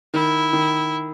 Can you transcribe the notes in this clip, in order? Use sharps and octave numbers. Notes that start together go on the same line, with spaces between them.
D#3 E4
D#3